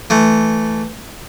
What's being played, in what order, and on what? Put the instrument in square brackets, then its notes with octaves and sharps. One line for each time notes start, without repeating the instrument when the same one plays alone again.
[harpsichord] E3 A3